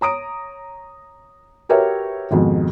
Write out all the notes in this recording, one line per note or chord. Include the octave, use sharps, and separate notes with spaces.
C#5 A#5 D#6 D7
F#4 G4 A#4 B4 C#5 E5
F2 G#2 B2 D#3